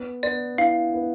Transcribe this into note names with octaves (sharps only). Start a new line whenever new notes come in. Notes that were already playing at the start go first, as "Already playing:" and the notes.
Already playing: B3
B3 D5
E4 F5
B3